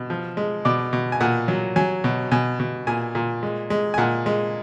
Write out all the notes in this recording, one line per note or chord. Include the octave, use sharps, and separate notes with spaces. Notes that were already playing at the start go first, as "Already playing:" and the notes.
Already playing: B2
F3
G#3
B2 D5
B2
G#5
A#2 F#5
F#3
F#3 G#5
B2
B2 G#5
B2
A#2 G#5
A#2
G#3
G#3
G#5
A#2 F#5
G#3